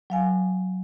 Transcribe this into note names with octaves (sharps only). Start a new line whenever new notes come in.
F#3 F5 G#5